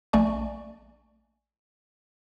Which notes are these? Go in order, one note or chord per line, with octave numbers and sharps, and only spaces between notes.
A#1 A3 D5 G#5 C#6